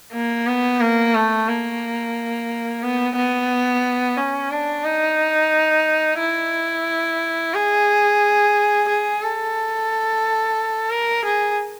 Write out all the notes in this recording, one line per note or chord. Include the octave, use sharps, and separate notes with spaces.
A#3
B3
A#3
A3
A#3
B3
B3
C#4
D4
D#4
E4
G#4
G#4
A4
A#4
G#4